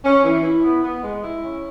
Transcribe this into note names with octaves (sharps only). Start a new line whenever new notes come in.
C#4
E3
E4
B3
B3
G#3
E4
C#4